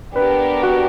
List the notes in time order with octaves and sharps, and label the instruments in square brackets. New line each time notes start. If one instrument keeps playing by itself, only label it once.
[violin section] B3 D4 G4 A#4 [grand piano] B4
[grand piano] F#4